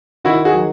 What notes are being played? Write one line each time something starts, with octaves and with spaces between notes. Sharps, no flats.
D#3 E4 F#4
F#4 G#4
F#3